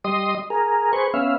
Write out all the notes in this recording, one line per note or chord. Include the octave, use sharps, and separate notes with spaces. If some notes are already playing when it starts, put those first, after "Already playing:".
G3 D#5 C6 D#6
G#4 A#4
G#4 B4 C5 C#6
B3 C#4 E5 F5